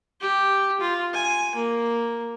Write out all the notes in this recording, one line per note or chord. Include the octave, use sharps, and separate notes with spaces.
G4
F4
G#5
A#3